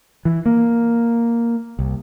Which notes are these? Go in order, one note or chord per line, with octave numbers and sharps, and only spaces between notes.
E3
A#3
C2